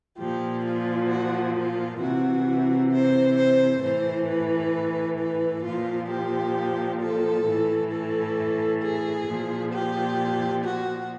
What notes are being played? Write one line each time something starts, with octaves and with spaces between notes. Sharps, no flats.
A#2 F3 G4
F4
F#4
F4
C3 E3 F#4
C5
C5
A2 E3 C5
B4
B4
A#2 F3 F4
G4
A4
A2 E3
A4
G#4
A#2 F3
G4
F#4